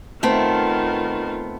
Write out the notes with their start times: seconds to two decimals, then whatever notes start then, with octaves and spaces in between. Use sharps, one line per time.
0.23 D#3 A3 B3 C4 F4